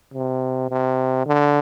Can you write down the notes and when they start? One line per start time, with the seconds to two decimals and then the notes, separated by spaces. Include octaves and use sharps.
0.14 C3
0.70 C3
1.26 D3